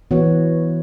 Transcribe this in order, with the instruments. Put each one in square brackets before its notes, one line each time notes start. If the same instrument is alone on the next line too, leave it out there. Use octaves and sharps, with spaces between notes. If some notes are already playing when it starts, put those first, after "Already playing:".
[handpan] E3 B3 F#4 C#5